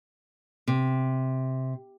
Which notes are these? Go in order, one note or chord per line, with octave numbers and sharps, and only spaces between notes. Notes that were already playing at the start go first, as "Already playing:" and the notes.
C3